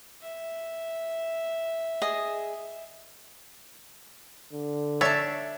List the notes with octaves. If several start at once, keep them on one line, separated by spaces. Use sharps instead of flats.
E5
G#4 D#5
D3
D4 A4 C#5 E5 A5